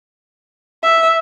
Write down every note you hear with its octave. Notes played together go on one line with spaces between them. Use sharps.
E5